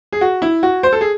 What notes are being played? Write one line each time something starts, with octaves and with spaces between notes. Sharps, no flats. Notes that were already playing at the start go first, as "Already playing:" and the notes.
G#4
F#4
E4
F#4
C5
A4
G#4